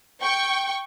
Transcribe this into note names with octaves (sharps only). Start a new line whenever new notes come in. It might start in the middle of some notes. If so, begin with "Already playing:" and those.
G5 C#6